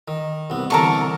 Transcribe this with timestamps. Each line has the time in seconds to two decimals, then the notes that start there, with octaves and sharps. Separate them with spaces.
0.08 D#3
0.50 C2 B3
0.70 C2 D3 E3 A#4 A5 C#6